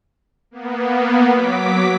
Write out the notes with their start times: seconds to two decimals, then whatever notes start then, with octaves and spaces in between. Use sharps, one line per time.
0.51 A#3 B3
1.27 F#3 D6 B6